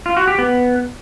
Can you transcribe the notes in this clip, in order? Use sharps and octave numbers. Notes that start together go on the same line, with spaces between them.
F4
F#4
G4
B3